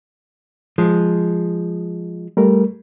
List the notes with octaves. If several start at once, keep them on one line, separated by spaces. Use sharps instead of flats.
F3 G#3
G3 A3 A#4